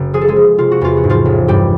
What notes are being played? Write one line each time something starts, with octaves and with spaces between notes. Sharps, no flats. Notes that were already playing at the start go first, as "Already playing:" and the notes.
Already playing: F#1
F3 G#4
A4
G#3 G#4
F3
C3 F4
F#4
E2 F4
F#4
G#2
F3 F4
A1
G2 G3 G4